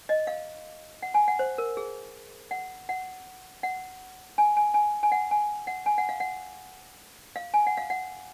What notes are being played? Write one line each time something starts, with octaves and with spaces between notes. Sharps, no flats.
D#5
F5
F#5
G#5
F#5
C5
A#4
G#4
F#5
F#5
F#5
G#5
G#5
G#5
G#5
F#5
G#5
F#5
G#5
F#5
F5
F#5
F5
G#5
F#5
F5
F#5